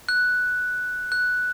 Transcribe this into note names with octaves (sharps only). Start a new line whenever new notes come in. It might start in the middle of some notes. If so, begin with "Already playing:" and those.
F#6
F#6